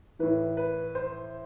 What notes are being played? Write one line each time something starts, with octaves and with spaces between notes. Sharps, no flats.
A2 E3 B4
B4
C5